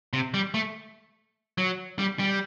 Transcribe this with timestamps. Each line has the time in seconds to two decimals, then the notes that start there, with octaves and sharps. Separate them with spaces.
0.13 C3
0.34 G3
0.54 A3
1.58 F#3
1.99 G3
2.19 G3